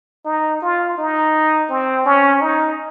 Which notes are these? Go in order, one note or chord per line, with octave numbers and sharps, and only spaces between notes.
D#4
F4
D#4
C4
C#4
D#4